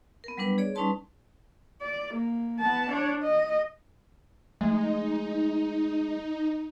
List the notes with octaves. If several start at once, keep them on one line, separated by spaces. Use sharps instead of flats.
B3 A#4
F#3 G3 B3 D4 B4
G#4 C#5 D5
G3 C#4 D#4 B4 A5 C6
D5
A#3
B3 A5
D4 C#5
D#5
F3 G#3 A3 D#4